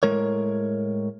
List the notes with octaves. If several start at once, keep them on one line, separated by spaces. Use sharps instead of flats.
A2 G#3 A#4 C#5